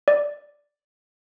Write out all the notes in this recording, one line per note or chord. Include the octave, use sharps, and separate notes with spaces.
D5